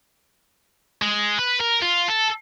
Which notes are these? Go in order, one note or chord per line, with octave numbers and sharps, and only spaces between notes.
G#3
B4
A#4
F4
A4